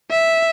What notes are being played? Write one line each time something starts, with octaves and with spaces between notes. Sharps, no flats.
E5